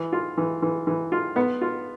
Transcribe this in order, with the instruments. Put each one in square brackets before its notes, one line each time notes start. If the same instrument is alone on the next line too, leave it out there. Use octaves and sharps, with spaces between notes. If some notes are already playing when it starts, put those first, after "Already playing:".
Already playing: [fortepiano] E3
F4
E3
E3
E3
F4
B3
F4